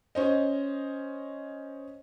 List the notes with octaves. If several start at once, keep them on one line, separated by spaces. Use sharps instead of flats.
C#4 C5 D#5